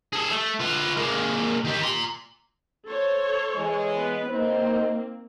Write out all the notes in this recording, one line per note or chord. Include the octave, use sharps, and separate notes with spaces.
G#4 A4
A3
F4 B4
G#3 A#3
D#3 G4
A#5 C6
A4 C5 C#5
E3 G#3
B3 B4
A#3 C4 D#4 C5